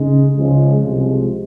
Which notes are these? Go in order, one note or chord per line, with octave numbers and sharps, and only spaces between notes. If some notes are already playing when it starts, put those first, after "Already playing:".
Already playing: C#3 G#3 D#4
C#2 C#3 F3 G#3
C2 C3 F3 G#3